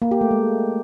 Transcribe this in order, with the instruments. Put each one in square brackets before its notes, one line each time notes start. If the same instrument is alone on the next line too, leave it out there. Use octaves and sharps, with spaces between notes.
[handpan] A#3
G4
A3
G#3